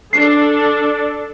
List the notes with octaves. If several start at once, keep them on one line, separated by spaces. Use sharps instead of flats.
D4 A4 C7